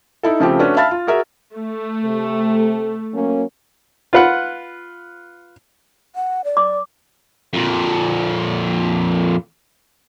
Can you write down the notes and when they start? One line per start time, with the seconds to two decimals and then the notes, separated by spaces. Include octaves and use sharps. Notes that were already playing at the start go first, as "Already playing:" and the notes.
0.23 D#4 E4 A4
0.40 C#3 F3 A3 C4 F4 G4
0.59 A3 C#4 D4 F#4 B4
0.76 E5 F5 A5 B5 F6 A6
0.91 F4
1.07 F#4 G#4 A#4 E5
1.54 A3
2.04 C3 A4
3.13 F#3 A#3 C#4
4.13 F4 B4 F#5
6.16 F#5
6.45 D5
6.57 D6
7.53 F2 A#2